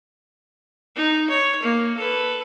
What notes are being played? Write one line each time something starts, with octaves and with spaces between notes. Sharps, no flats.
D#4
C#5
A#3
A4 B4